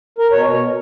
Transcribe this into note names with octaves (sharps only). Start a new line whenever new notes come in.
A#4
B2 C#5